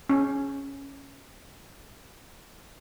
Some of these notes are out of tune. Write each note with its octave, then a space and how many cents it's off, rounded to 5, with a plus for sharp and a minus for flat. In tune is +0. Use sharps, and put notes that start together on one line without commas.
C#4 -5